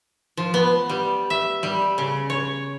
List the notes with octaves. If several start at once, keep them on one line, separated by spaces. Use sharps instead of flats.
F3
B3
G3
E5
G3
C#3
C#5